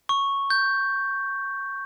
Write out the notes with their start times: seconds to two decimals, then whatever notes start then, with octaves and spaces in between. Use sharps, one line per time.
0.09 C#6
0.50 G6